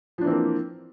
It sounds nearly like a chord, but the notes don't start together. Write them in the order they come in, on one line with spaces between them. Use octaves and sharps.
F3 D4 E3 C4 A#3